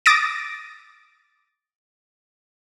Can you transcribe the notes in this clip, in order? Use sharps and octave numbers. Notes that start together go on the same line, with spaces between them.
D6 D#6 A6 A#6 D7